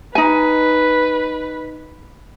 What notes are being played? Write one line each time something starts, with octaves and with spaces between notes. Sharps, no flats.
D#4 B4 G#5